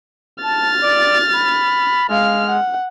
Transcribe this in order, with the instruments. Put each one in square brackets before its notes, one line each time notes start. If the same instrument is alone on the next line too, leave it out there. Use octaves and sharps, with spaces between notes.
[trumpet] A5 [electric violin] F6 A6
[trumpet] D5
B5
[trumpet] G#3 [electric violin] F5 F6
[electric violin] F#5